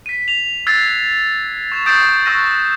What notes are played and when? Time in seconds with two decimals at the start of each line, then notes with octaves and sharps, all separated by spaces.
0.06 B6 D#7
0.28 F7
0.67 E6 F#6 G#6 A6 C7
1.72 C#6 G#6 E7
1.86 C#6 D#6 G6 A6 C7 D7
2.25 C#6 E6 F#6 A#6 D#7